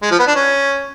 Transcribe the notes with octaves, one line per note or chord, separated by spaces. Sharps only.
G#3
F3
B3
D4
C#4